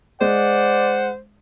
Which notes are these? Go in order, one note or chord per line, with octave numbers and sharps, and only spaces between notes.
G#3 C5 D5 F#5